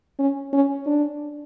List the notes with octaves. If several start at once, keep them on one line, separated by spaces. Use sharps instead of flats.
C#4
C#4
D4